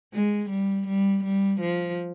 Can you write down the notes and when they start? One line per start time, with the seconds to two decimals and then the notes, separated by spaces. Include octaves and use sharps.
0.14 G#3
0.50 G3
0.88 G3
1.24 G3
1.61 F3